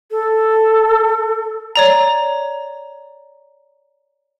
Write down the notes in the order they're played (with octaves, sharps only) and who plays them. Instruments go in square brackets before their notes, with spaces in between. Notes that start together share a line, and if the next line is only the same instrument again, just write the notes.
[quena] A4
[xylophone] C#5 D5 A#5